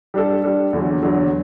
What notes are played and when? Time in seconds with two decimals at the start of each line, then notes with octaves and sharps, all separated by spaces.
0.14 G3 D4 A4
0.44 G3 D4 A4
0.73 E2 D3 F#3
1.03 E2 D3 F#3